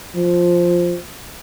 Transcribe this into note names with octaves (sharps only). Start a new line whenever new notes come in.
F3